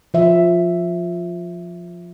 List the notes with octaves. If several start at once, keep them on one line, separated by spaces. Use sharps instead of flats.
F3 E5